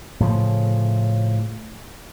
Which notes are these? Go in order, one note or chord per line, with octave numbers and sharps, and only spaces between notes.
A2 C#3 F3